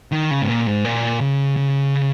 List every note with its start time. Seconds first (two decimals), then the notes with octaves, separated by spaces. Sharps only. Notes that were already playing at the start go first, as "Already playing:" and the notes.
0.12 D#3
0.31 C#3
0.42 G#2
0.49 A#2
0.66 G#2
0.85 A#2
1.21 C#3
1.57 C#3